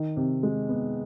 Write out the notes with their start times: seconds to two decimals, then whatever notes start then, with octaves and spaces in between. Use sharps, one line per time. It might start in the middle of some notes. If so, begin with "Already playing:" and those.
Already playing: D#3
0.17 C3
0.43 G#3
0.69 B3